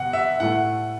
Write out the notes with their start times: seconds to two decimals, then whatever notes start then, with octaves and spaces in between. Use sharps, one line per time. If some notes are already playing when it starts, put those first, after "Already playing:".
Already playing: B2 F#5
0.13 E5
0.40 A2 A3 F#5